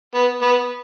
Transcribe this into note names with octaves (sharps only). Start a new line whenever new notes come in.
B3
B3